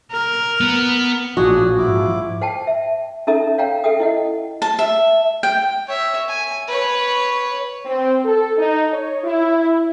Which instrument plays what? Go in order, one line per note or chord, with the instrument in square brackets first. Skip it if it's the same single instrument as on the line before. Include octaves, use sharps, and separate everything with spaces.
[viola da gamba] A#4
[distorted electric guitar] B3
[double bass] A#1 A2 [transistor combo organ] F3 [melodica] D4 G#4 G#5 [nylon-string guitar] F#4
[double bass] G#2 [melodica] E4 D6
[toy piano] C5 F#5 G5 A5
E5
C#4 D#4 A4 E5 A#5 D#6
C#5 F5 G5 A#5
A4 E5 F#5 G5 D#6
E4 D#5 F#5
[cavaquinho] A5
E5
G5
[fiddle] C#5 E5
G#5
B4 C#5
[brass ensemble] C4
A4
D#4
C#5
E4